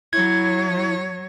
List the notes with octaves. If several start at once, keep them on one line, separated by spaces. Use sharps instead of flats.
F#3 E4 C#5 G#6